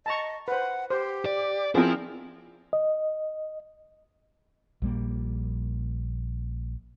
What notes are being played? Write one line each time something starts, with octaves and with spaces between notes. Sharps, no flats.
D#5 A5 A#5 C#6
B4 C5 F#5
G4 C5
D5
F3 C4 E4 F4 G#4 A#4
D#5
A#1 G3 A#3